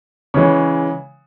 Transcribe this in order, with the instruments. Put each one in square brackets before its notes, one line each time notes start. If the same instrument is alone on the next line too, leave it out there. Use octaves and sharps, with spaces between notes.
[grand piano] C#3 E3 G#3 C#5